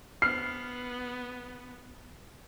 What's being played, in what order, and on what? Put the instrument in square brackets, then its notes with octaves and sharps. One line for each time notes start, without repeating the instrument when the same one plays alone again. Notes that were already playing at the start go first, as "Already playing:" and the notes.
[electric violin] B3 [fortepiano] F6 [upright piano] C7